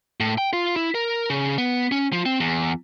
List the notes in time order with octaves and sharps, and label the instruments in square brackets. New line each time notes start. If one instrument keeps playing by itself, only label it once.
[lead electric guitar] A2
G5
F4
E4
A#4
C#3
B3
C#4
F3
C4
E2